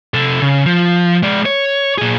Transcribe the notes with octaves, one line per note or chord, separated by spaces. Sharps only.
C3 A4
C#3
F3
G#3 D5
C#5
A#2 G#4